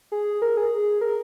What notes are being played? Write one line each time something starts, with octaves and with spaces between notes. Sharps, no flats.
G#4
A#4
G#4
A#4